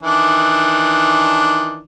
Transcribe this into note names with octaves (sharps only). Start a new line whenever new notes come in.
D#3 E3 D4